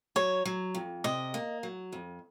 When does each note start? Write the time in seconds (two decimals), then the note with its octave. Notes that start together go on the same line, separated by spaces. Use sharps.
0.16 F#3 C#5
0.45 F#3
0.75 F2
1.04 C3 D#5
1.34 A#3
1.63 F#3
1.92 F2